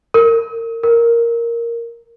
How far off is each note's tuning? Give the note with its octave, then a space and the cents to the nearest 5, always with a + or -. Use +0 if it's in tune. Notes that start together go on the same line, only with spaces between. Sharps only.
A#4 -30
A#4 +0